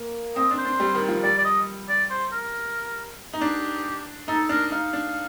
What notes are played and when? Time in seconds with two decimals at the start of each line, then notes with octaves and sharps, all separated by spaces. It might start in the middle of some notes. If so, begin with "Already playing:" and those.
Already playing: A#3
0.36 C4 D#5
0.51 D4
0.58 C5
0.65 D4
0.80 G3
0.95 D#3
1.09 F3
1.23 G3 D5
1.38 D5
1.45 D#5
1.89 D5
2.10 C5
2.32 A#4
3.33 D#4
3.41 D4 G4
4.28 D#4 A4
4.49 D4 A#4
4.72 D#4 F5
4.93 D4